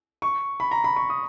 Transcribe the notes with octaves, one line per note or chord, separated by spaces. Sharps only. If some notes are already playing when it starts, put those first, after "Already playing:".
C#6
B5
A#5
B5
C#6
D#6